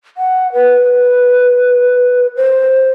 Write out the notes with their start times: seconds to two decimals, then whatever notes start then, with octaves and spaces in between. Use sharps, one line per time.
0.17 F#5
0.53 B4
2.37 C5